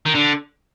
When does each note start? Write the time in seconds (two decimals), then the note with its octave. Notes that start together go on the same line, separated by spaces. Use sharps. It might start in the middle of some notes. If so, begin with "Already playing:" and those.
0.06 D#3
0.15 D3